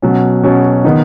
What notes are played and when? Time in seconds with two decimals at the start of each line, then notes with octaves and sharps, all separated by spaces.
0.02 B2 F#3 C#4
0.43 B2 F#3 C#4
0.84 D#3 B3 D#4